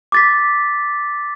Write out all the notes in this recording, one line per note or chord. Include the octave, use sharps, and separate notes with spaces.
D6 A6 B6